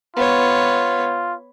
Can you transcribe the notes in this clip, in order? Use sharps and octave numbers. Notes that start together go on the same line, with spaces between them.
B3 F4 C#5